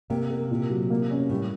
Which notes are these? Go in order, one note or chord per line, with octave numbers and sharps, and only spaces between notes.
C3 A#3
A#4
A#2
F#3
A#3
C#4
A2 G3